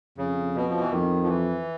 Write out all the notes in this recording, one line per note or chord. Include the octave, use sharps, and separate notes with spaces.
F2 C#3
B2
F3
E3
F2 D#3
F3
E3